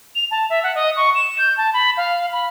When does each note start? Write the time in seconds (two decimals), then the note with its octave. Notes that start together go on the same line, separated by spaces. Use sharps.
0.15 F7
0.31 A5
0.50 E5
0.63 F#5
0.75 D#5
0.97 C#6
1.15 E7
1.38 G6
1.57 A5
1.74 B5
1.97 F5
2.32 B5